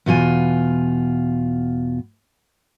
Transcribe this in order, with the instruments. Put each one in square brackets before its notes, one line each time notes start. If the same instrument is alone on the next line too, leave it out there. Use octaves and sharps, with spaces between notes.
[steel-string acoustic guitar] E2 B2 F4 G#5